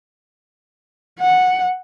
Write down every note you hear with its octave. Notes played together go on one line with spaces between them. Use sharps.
F#5